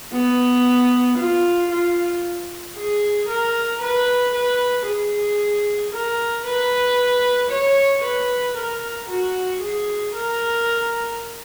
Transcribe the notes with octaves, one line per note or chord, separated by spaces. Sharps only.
B3
F4
F4
G#4
A#4
B4
B4
G#4
A#4
B4
C#5
B4
A#4
F#4
G#4
A#4